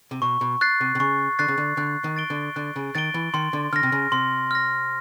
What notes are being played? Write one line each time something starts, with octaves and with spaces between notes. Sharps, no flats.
C3
B2 C#6
B2
F#6 A6 C7
C3
C3
C#3 C#6
D3 F#6 A6 C7
C#3
D3
D3 F#6
D#3
A6 D7 G7
D3
D3 F#6
C#3
D#3 A6 D7 G7
E3
D#3 C6
D3
D3 F6 A#6
C3
C#3
C3 C6
F6 A#6